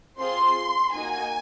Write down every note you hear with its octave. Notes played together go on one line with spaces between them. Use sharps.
C4 F4 G#4 C6
A#3 D#4 F#4 G#5